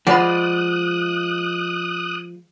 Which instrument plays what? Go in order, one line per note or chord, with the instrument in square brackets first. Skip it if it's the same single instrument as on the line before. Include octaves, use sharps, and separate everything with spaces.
[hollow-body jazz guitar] F3 G#3 [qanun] D5 [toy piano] F#5 B5 [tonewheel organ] D#6 F#6